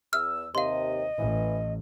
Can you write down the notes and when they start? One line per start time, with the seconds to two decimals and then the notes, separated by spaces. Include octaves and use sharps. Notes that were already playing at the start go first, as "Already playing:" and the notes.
0.13 E2 E6 F6
0.55 D#2 C3 D#5 F5 C6
1.18 A1 E3